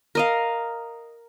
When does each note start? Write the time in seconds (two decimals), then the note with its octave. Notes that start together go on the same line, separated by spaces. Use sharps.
0.15 A#4 D#5 F5